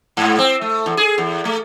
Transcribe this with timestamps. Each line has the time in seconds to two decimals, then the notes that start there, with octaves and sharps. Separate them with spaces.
0.17 G#2
0.39 C4
0.61 A3
0.86 E2
0.97 G#4
1.18 E2
1.45 A3